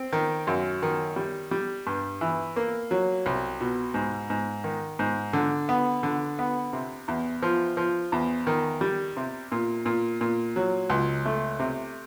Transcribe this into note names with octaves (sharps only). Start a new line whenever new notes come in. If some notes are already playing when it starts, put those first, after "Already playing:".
Already playing: C4
D#3
F#2
D#3
G3
G3
G2
E3
A#3
F#3
C2
B2
G#2
G#2
D#3
G#2
D3
B3
D3
B3
C3
E2
F3
F3
E2
D#3
G3
C3
A#2
A#2
A#2
F#3
C#2
A3
C3